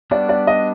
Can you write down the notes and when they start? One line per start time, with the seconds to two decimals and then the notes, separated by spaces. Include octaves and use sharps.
0.11 G3 B3 D4 F#4 D5
0.29 D5
0.47 D#5